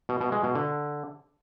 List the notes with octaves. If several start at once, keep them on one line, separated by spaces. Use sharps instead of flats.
B2
B2
G#3
B2
D3